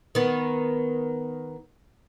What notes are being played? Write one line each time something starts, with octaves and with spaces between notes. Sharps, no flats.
D#3 B3